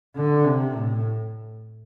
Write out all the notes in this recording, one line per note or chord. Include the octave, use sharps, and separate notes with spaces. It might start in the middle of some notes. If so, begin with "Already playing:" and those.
D3
C3
A2